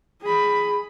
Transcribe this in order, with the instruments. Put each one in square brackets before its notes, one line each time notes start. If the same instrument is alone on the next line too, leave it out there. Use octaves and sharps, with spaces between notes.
[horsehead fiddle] G#4 B5